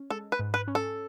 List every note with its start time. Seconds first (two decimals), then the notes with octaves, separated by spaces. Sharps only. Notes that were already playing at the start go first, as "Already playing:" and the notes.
Already playing: C#4
0.10 G#3 A4
0.32 B4
0.39 G#2
0.54 B4
0.68 C#4
0.75 A4